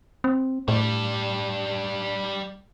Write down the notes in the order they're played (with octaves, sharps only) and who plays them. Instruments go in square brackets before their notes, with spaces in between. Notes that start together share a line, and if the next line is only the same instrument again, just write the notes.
[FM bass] C4
[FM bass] A2 [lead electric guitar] G3 D4